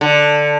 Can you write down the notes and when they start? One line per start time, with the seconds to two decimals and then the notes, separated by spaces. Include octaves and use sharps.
0.01 D3